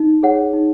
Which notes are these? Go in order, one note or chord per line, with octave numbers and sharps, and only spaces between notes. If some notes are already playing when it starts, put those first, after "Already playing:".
Already playing: D#4
G#4 C#5 F#5
D#4